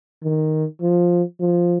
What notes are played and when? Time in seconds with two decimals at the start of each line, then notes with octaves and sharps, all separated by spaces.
0.24 D#3
0.81 F3
1.40 F3